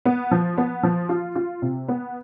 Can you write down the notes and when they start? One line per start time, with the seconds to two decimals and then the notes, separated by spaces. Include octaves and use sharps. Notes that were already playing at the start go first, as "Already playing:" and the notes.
0.05 B3
0.31 F3
0.58 B3
0.83 F3
1.09 F4
1.35 F4
1.62 C3
1.88 B3